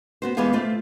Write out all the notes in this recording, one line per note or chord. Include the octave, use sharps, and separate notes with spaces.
B3 F#4 C5
E2 G#3 B3 G4 G#4 F5
A3 F4 C5